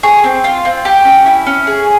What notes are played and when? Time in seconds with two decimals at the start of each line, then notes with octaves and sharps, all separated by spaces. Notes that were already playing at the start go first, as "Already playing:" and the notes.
0.03 G#4 C#6
0.24 C4
0.44 F4
0.65 C4
0.85 G4
1.05 C#4
1.26 E4
1.47 C#4
1.67 G#4